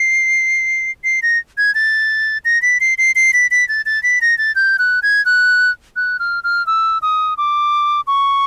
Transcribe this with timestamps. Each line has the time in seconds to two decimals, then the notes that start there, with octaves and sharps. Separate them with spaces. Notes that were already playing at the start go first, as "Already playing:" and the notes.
Already playing: C7
1.04 C7
1.22 A#6
1.58 G#6
1.75 A6
2.45 A#6
2.62 B6
2.80 C7
2.98 C7
3.15 C7
3.33 B6
3.51 B6
3.69 A6
3.86 A6
4.03 B6
4.21 A#6
4.38 A6
4.56 G6
4.79 F#6
5.03 G#6
5.25 F#6
5.96 F#6
6.19 F6
6.44 F6
6.67 E6
7.02 D#6
7.37 D6
8.07 C#6